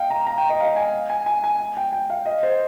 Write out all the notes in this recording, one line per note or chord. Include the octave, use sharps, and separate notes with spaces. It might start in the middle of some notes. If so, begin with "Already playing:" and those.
Already playing: D#5 F5 G5
A#5
A#5
G5
D#5
F5
G#5
G#5
G#5
G#5
G5
G5
F5
D#5
C5